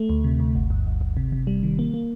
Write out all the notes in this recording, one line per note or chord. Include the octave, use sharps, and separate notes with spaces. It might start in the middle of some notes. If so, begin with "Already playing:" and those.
Already playing: A3
D2
C3
D2
G1
G2
G1
G1
C3
C3
G3
D#3
A#3
A#3